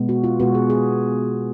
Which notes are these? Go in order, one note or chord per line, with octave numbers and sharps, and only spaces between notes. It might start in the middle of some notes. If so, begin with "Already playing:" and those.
Already playing: B2 G#3 B3
F#4
F4
B2 G#3 B3 F#4
G#4
G#4